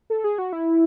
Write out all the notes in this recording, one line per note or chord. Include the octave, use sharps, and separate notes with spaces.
A4
G#4
F#4
E4